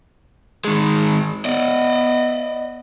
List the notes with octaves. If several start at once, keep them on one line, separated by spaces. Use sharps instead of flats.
D#3 G#3
B3 D5 D#5